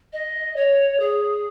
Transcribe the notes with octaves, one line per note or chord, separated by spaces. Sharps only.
D#5
C#5
G#4